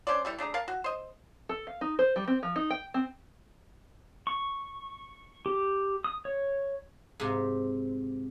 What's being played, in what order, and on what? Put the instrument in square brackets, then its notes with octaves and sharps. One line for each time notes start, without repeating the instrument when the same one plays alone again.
[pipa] C#4 D4 C5 D5
E3 G3 A4
A3 D4 G#4 A#5
A#4 F5 A5
F#4
C5 D#5
[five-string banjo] A4
F5
D#4
C5
G3
C4
F3
D#4
G5
C4
[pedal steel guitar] C#6
G4
D#6
C#5
[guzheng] G#2 C3